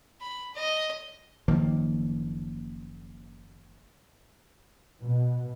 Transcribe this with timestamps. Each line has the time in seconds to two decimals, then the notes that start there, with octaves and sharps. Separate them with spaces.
0.21 B5
0.55 D#5
1.48 F#1 D#3 F3 A#3
5.01 B2